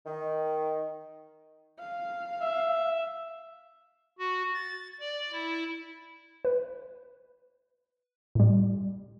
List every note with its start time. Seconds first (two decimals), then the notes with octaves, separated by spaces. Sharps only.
0.05 D#3
1.80 F5
2.41 E5
4.19 F#4
4.54 A6
5.00 D5
5.32 E4
6.45 B4
8.35 A2 G3